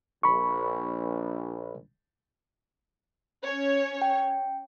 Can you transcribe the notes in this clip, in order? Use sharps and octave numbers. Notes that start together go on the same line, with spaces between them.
A#1 B5 C#6
C#4 C#5
G5